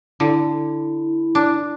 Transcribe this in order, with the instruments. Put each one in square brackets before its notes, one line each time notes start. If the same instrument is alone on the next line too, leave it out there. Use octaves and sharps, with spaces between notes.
[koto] D3 [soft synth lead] E4
[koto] D4